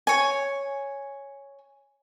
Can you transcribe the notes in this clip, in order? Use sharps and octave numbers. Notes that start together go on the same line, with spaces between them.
C#5 G#5